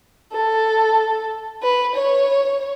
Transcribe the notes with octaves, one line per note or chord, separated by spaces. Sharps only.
A4
B4
C#5